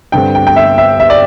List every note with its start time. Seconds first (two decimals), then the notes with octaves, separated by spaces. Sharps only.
0.12 G2 D3 C4 G5
0.35 G5
0.47 G5
0.56 E5
0.78 E5
1.00 E5
1.10 D5